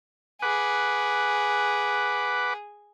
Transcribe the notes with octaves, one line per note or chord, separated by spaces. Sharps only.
G#4 B4 F#5 D6